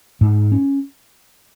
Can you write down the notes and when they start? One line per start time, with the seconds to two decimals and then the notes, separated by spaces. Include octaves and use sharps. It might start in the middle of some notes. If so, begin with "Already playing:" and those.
0.21 G#2
0.52 C#4